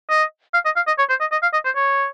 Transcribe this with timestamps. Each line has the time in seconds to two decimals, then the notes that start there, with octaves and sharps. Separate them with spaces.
0.10 D#5
0.54 F5
0.65 D#5
0.76 F5
0.87 D#5
0.98 C#5
1.09 C5
1.21 D#5
1.32 D#5
1.42 F5
1.53 D#5
1.65 C5
1.76 C#5